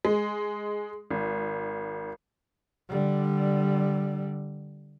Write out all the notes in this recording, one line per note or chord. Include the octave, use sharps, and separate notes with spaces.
G#3
G#1
D3 G3